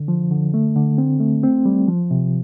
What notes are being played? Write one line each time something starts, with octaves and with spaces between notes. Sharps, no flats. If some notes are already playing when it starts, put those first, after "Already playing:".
Already playing: D3
F3
D3
A3
D3
C4
A3
C4
G3
F3
C3